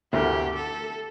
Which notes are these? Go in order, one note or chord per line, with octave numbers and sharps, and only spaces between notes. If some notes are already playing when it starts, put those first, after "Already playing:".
D2 D3 A3 E4 G4 A#4
A4